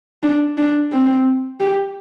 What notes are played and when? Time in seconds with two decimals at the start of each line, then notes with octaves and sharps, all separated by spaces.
0.23 D4
0.58 D4
0.92 C4
1.60 G4